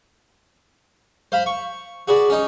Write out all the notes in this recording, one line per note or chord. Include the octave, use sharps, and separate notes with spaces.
C5 F5 B5
C#6
F#4 G#4 B4 D5
C#4 D#4